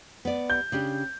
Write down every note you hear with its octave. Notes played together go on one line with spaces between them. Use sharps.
B3 D5
G6
C#3 D4 G4